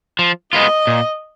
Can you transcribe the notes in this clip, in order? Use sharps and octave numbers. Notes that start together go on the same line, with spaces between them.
F3
G#3 B3 F4 D#5
A#2